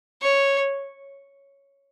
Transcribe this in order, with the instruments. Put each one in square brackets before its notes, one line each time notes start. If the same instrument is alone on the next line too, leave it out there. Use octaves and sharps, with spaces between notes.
[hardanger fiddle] C#5